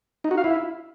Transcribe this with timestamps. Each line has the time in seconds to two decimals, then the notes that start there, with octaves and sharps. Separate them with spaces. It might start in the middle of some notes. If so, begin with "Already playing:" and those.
0.24 D#4
0.31 F#4
0.37 F5
0.44 E4